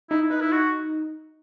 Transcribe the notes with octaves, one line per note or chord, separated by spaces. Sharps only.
D#4 E4
D#4 B4
E4
F#4